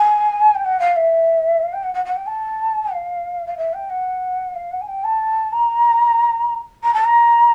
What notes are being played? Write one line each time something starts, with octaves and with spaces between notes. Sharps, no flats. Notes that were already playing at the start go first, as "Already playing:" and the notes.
Already playing: G#5
G5
F#5
F5
E5
F5
G5
F#5
F#5
F#5
G5
A5
F5
F5
E5
G5
F#5
F5
F#5
G#5
G5
A5
A#5
A#5
A5
A#5